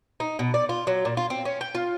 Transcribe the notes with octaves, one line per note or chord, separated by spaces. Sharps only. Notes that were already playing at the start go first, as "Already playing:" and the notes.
D#4
B2
D5
F4
F#3
A#2
F4
C4
C#4
G5
F4